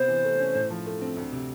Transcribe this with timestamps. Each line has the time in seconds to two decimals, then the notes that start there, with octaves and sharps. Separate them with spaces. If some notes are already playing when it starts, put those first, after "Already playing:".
Already playing: C3 B3 C5
0.08 E3
0.24 A3
0.39 C#4
0.55 A2
0.70 F3
0.86 A3
1.01 C4
1.17 D2
1.32 C3